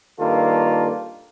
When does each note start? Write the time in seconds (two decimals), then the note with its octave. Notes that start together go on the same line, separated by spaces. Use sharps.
0.19 G2 D#3 A#3 F4 A4